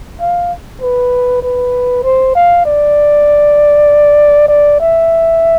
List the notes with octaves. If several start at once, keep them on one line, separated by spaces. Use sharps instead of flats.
F5
B4
B4
C5
F5
D5
D5
E5